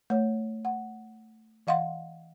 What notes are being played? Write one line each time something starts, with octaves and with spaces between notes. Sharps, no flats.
A3 C#5
F#5
E3 D#5 F5 F#5 C6